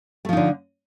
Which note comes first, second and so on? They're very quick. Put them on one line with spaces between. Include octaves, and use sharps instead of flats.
A3 F3 D#4 D3